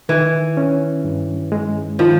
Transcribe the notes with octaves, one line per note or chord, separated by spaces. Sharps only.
D#3 E3
C#4
G2
G#3
D#3 F3